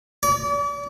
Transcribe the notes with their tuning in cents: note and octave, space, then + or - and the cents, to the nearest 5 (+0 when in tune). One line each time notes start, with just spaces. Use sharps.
D5 -40